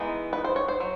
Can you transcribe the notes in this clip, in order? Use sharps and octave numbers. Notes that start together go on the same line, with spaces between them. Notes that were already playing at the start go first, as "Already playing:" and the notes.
Already playing: E3 G#3 B3 D#4
B4
C5
C#5
C5
F#3